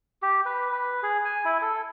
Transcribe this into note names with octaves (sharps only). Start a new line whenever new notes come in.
G4
B4
B4
G#4
G#5
E4
A4